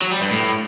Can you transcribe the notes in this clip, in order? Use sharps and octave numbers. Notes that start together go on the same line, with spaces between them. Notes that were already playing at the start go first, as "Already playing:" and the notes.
F#3
G3
G2
A2